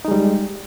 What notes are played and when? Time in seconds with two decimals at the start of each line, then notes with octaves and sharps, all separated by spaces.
0.05 D#4
0.08 G#3
0.11 G3